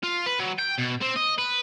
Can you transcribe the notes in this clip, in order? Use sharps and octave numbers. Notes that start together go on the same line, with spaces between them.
F4
B4
F#3
G5
B2
C4
D#5
B4